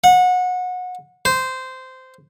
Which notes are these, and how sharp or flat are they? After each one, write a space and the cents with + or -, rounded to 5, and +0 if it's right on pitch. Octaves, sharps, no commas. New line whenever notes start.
F#5 -25
C5 -15